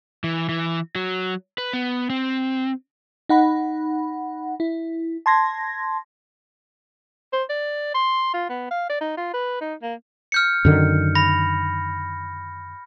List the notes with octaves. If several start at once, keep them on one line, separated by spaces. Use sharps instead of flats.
E3
E3
F#3
B4
B3
C4
D#4 F#5 B5
E4
A5 C6 G#6 A#6
C5
D5
C6
F4
B3
F5
D5
D#4
F4
B4
D#4
A#3
F6 G6 C#7
F#2 D3 D#3
B5 A#6